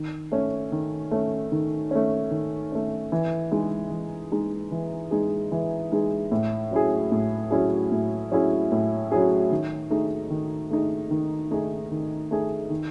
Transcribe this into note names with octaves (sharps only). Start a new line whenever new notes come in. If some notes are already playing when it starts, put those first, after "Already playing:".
Already playing: D#3
A3 C#4
D#3
A3 C#4
D#3
A3 C#4
D#3
A3 C#4
E3
G#3 D#4 G#4
E3
G#3 D#4 G#4
E3
G#3 D#4 G#4
E3
G#3 D#4 G#4
A2
F#3 C#4 E4 G#4
A2
F#3 C#4 E4 G#4
A2
F#3 C#4 E4 G#4
A2
F#3 C#4 E4 G#4
D#3
A3 D#4 G#4
D#3
A3 D#4 G#4
D#3
A3 D#4 G#4
D#3
A3 D#4 G#4
D#3